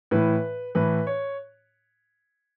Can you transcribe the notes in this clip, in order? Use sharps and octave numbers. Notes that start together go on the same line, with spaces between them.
A2 E3 B4
A2 E3 B4
C#5